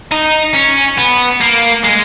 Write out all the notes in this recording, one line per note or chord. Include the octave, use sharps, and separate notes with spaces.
D#4
C#4
B3
A#3
G#3